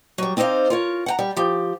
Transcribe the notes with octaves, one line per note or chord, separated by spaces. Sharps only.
F#3 G3
C4 D#4 C5 D5 F5
F4 A#4 C#5
F#5 G5 A#5
G3
F3 G4